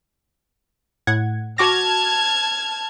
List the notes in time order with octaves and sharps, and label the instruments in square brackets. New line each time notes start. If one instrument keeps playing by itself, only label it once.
[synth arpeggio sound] A2 F#5 G#6
[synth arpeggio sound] F#4 D6 A#6 [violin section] A5 F6 G#6